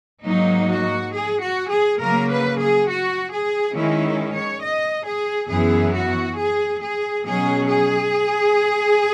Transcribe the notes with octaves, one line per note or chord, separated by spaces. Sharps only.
G#2 F#3 A#3 D#4
F#4
G#4
F#4
G#4
C#3 F#3 A#3 A#4
B4
G#4
F#4
G#4
D#3 G#3 C#4 E4
C#5
D#5
G#4
F#2 E3 B3 E4 G#4
F#4
G#4
G#4
B2 F#3 C#4 G#4
G#4